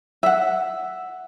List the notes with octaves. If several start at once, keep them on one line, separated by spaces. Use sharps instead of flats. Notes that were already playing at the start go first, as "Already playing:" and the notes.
E5 F#5